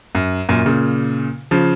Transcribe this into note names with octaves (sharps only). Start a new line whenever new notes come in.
F#2
F#2 A#2
A#2 C#3
C#3 F3